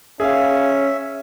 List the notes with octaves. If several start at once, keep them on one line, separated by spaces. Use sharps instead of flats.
C#4 G#4 E5 F5